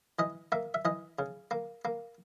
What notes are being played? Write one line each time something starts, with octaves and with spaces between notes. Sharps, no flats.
E3 D#5
A#3 E5
E5
E3 D#5
C#3
A#3
A#3